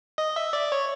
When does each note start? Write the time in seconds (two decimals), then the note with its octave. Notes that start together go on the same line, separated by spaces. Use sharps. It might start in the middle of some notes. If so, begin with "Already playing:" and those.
0.18 D#5
0.36 E5
0.53 D5
0.72 C#5